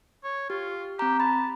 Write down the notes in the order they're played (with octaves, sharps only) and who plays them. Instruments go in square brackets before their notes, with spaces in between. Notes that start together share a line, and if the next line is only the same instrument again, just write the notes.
[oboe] C#5
[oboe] F4 [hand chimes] G4
[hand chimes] C4 A#5 [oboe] G4
[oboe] A5 [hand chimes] B5